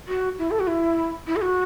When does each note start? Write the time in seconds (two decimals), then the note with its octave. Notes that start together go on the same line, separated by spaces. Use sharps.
0.08 F#4
0.39 E4
0.51 A4
0.60 F#4
0.67 E4
1.27 E4
1.36 A4
1.42 F#4